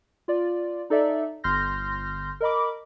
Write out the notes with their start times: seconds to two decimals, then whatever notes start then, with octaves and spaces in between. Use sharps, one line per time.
0.28 F4 D5
0.90 D#4 A4 D5 E5
1.44 G1 C6 F6 G6 A#6
2.41 A#4 D#5 B5 D6